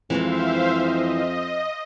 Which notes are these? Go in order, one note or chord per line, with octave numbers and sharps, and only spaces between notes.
F2 E3 G#3 C4 C5 E5 F5
D#5